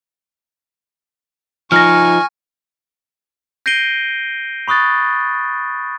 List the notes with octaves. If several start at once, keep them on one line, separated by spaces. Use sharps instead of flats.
F3 D#4 G#5 C#6 F6 A#6
G6 A#6 C7 D7 D#7 G7
B5 C#6 D#6 F#6 A6